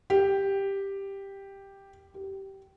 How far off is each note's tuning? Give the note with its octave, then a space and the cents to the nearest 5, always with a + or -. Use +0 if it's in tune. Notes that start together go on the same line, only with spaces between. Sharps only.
G4 +5
G4 -15